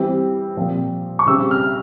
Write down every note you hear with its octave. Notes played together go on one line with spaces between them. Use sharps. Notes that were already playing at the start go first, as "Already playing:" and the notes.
Already playing: E3 G3 C4
A#2 F3 C4
C#6
C#3 G3 C4 E6
F6